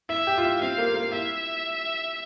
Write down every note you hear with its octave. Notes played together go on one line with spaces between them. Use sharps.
E4 E5
G4
F4
E4
C4 F5
A#3
A#3
E4 E5